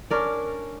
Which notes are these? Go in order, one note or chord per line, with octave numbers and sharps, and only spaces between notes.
C#4 D4 A#4 D5